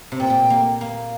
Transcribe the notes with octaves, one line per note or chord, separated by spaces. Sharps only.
C3
A#2 G5
A#2
A#3
A#3 F5